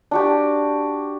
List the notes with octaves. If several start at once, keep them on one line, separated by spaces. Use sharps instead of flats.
D4 F#4 G4